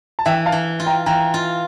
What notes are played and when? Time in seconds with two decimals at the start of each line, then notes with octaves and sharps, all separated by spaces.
0.19 A5
0.26 E3 E5 G5
0.46 F5 A5
0.52 E3
0.80 F4
0.86 G5 A#5
1.06 E3 G5 A#5
1.34 F4